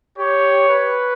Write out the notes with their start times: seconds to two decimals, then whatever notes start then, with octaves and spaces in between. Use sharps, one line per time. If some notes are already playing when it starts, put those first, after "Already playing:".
0.18 G4 C#5
0.68 B4